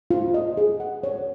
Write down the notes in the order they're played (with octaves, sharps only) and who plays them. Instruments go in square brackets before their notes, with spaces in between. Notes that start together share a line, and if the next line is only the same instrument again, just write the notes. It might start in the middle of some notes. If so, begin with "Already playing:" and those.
[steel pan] F4
D#5
G#4
F#5
C#5